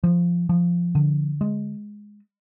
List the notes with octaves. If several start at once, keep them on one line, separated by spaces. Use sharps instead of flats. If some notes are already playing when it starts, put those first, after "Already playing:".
F3
F3
D3
G#3